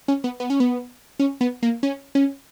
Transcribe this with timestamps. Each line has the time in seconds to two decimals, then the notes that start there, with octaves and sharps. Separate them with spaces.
0.08 C#4
0.24 B3
0.40 B3
0.50 C#4
0.60 B3
1.19 C#4
1.41 B3
1.63 A#3
1.83 C#4
2.15 C#4